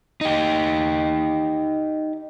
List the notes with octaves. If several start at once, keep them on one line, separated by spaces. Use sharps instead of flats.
D#4 G4